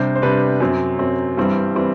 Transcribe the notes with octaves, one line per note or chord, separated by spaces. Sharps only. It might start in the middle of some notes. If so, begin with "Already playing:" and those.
Already playing: C3 G3 D4 C5
C5
C3 G3 D4 B4
F#2 F#3 C4
F#2 F#3 C4
G2 E3 G3 C4
E3 G3 C4